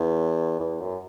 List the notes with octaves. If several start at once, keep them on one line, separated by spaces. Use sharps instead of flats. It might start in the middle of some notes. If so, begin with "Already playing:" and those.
Already playing: E2
E2
F#2